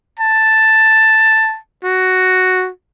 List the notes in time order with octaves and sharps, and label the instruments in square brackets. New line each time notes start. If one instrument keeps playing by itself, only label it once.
[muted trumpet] A5
F#4